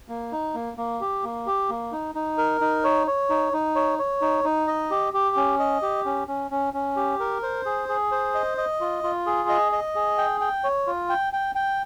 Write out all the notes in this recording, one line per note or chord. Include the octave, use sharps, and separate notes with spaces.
A#3
D#4
A#3
A#3
G4
A#3
G4
A#3
D#4
D#4
A#4
D#4
C#5
C#5
D#4
D#4
C#5
C#5
D#4
D#4
D#5
G4
G4
C#4
D#5
G4
C#4
C#4
C#4
C#4
G4
A#4
C5
G#4
G#4
C5
D#5
D#5
F4
F4
G#4
D#5
D#5
G#4
G5
G5
C#5
F4
G5
G5
G5